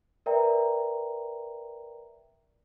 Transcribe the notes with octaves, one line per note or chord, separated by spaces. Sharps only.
A#4 B4 D5 E5 G5 A#5